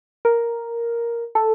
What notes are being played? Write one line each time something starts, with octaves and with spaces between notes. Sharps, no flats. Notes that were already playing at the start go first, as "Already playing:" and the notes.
A#4
A4